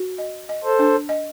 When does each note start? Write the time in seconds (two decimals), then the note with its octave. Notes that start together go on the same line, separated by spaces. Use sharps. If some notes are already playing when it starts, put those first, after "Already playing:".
Already playing: F#4
0.18 D#5
0.49 D#5
0.64 A4 C5
0.79 D4
1.09 D#5